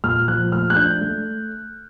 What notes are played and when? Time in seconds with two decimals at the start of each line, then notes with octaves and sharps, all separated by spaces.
0.04 A#2 F6
0.28 F3 F#6
0.52 A3 F6
0.70 F#6
0.76 D4 G6
1.01 A3